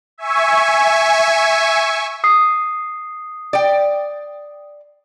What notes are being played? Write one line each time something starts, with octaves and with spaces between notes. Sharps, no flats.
E5 G#5 C#6
D#6 C7
D5 G5